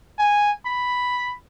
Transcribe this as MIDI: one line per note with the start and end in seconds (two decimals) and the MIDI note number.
0.18 0.51 80
0.65 1.32 83